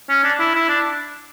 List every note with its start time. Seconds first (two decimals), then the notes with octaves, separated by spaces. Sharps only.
0.09 C#4
0.24 D4
0.39 E4
0.54 E4
0.69 D4